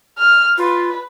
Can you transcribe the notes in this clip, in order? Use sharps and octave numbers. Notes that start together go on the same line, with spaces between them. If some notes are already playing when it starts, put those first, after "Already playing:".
F6
F4 B4